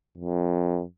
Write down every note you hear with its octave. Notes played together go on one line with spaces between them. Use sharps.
F2